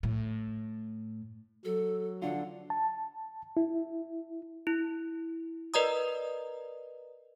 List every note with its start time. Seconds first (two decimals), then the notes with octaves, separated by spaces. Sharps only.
0.03 A2
1.65 F#3 A4
2.22 D3 D4 F4 F#5
2.70 A5
3.57 E4
4.67 E4
5.74 A#4 B4 D5 D#5 A#5 D#6